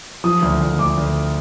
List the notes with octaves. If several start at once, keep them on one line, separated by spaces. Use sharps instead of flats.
F3 D#6
D2
D2
D2 D6
D2